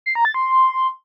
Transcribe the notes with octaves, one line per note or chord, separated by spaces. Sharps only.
C7
A#5
A6
C6